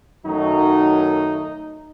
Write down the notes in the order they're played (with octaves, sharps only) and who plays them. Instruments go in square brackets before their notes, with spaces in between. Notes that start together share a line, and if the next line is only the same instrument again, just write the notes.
[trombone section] F#2 D#3 F#3 A3 D#4